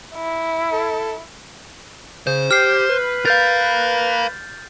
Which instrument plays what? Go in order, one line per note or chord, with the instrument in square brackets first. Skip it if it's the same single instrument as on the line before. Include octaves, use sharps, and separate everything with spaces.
[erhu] E4
[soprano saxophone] A4
[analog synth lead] C#3 [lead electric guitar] C5 [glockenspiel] G6
[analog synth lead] G4 [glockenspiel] F6 C7
[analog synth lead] B4
[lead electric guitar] A#4 F5 [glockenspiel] G6 A6